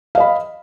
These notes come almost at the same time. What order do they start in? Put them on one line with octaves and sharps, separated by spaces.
F5 D#5 B5